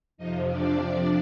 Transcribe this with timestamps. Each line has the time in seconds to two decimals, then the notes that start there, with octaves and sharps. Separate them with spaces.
0.18 F2 C3 F3 D#4 D#5
0.48 D4 D5